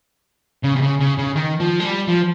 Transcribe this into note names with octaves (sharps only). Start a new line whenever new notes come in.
C#3
C3
C#3
C#3
C#3
D#3
F3
G#3
G3
F3